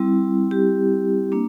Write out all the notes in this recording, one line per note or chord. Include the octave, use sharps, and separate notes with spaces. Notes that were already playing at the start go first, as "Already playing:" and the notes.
Already playing: G3 C4 E4
G4
A#3 D4